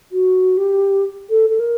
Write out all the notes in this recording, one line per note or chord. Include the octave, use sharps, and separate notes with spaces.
F#4
G4
A4
A4
A#4